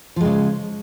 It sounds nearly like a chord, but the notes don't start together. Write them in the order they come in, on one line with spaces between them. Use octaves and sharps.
F3 G#3 C#3